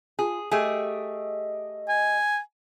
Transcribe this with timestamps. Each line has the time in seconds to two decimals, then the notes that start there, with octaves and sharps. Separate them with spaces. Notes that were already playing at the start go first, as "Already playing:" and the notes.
0.19 F4 G#4
0.51 A3 G4 G#4 D#5
1.88 G#5